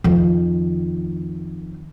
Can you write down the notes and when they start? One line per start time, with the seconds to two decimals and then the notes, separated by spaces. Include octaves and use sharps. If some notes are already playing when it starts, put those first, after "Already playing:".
0.04 F2 D#3